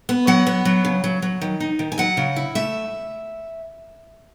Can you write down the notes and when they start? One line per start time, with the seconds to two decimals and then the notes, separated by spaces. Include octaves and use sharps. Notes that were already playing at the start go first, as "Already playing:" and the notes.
0.09 B3
0.27 F#3 F#5
0.47 B3
0.65 F#3
0.85 C#3
1.04 F#3
1.22 F#3
1.41 D#3
1.60 D#4
1.79 D#3
1.92 G#5
1.98 F#3 F#5
2.17 C#3
2.36 E4
2.55 A3 E5